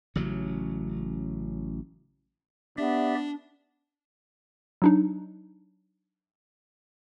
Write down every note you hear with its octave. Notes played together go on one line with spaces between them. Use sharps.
A1 C#3 F#3
B3 D4 G4 D5 E5
F#3 D4 D#4